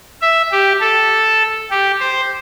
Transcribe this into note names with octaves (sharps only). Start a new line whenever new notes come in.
E5
G4
A4
G4
C5